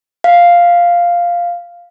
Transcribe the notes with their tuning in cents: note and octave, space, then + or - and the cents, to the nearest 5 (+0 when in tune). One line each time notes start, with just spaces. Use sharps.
F5 +0